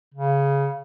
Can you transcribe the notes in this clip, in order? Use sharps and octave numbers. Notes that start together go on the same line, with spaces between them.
C#3